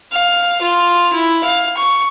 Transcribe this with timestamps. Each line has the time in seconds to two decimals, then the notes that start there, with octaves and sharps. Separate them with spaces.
0.13 F5
0.62 F4
1.13 E4
1.44 F5
1.77 C#6